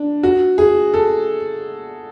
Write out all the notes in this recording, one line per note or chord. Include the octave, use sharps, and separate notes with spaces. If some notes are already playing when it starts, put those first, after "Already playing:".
Already playing: D4
F#4
G#4
A4